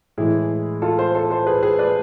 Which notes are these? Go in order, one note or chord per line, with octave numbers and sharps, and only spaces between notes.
A2 E3 G#3 E4 G#4
F4 A4
A4 C5
A4 C5
A4 C5
G#4 B4
G#4 B4
B4 D5